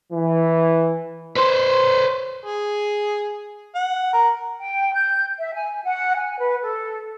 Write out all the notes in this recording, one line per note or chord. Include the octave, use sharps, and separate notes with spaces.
E3
B4 C5
G#4
F#5
A#4
G5
G6
E5
G#5
F#5
G#5
B4
A4